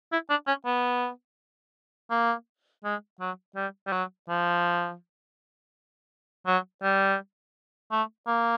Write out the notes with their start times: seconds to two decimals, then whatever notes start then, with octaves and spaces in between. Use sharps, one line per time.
0.12 E4
0.30 D4
0.47 C#4
0.65 B3
2.10 A#3
2.84 G#3
3.20 F#3
3.56 G3
3.87 G3
3.92 F#3
4.29 F3
6.47 F#3
6.83 G3
7.91 A3
8.27 A#3